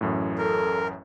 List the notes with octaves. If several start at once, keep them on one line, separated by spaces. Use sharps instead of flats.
A1 F#2 A2
A4 A#4